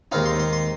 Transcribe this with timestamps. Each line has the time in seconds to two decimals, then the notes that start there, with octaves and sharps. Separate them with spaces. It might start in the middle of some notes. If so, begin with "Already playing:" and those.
0.12 D#2 D#3 G#3 C4 D#4 F5
0.25 C6
0.39 C6
0.53 C6